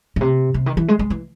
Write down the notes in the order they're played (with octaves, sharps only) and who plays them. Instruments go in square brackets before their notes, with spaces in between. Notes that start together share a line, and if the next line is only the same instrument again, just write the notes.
[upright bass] A2
C3
C3
D#3
E3
G#3
G#3
E3